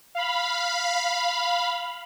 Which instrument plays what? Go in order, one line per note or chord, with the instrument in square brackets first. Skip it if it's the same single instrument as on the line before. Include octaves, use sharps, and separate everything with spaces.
[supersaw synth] F5 B5